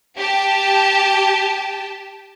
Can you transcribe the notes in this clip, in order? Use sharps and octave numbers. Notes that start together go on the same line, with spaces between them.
G4 A5